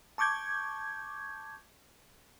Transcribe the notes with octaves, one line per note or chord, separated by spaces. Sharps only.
A5 C#6 D6 G6 G#6